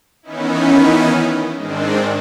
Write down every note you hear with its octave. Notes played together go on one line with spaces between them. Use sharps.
D#3 E3 B3 C#4 D#4 E4
G#2 D#3 G#3 C4 D4